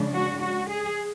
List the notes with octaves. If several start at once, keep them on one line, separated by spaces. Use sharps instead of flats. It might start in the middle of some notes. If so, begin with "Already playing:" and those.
Already playing: C#3 F3 G#3 D4
F#4
F#4
G#4